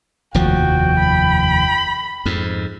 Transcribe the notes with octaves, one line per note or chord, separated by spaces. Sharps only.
F1 D#2 F3 F#4 G5
B5
F2 G#2